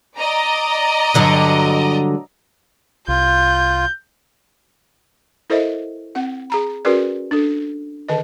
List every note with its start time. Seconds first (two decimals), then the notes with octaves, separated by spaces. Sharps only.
0.19 D5 D#5 A#5
1.14 G2 D3 F#3
3.08 C2 F4 G6
5.50 E4 A4 A#4 C5 D#5 E5
6.15 C4 F#5
6.50 G#4 A#5 B5
6.85 C#4 F#4 G#4 A#4 B4 D5
7.31 D4 A4
8.09 D3 D#3 B4 D#5